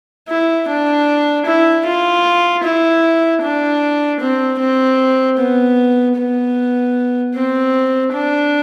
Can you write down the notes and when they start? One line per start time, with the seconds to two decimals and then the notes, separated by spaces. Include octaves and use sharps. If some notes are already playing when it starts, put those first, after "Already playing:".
0.28 E4
0.68 D4
1.46 E4
1.85 F4
2.63 E4
3.42 D4
4.20 C4
4.59 C4
5.37 B3
6.16 B3
7.33 C4
8.12 D4